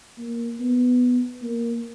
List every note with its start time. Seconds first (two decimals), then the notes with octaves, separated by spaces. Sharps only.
0.19 A#3
0.60 B3
1.43 A#3